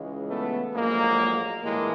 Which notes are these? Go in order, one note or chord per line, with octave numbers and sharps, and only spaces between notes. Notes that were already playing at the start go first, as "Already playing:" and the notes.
Already playing: C#2 C#3 E3 G#3
A3 B3
A#1 A2 F#3 G#3 A#3
A#1 A2 E3 G3 G#3 A#3